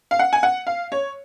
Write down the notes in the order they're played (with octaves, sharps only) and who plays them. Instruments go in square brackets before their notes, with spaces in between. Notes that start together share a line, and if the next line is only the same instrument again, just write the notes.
[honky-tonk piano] F5
F#5
G#5
F#5
F5
C#5